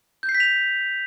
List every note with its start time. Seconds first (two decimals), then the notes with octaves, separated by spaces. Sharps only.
0.23 G6
0.29 C7
0.35 B6
0.40 F7